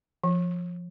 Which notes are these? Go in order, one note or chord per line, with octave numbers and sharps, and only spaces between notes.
F3